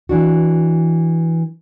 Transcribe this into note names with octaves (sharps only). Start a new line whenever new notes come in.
E3 D4 F#4